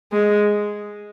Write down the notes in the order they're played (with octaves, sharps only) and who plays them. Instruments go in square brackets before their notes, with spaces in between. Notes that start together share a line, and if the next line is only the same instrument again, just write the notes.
[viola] G#3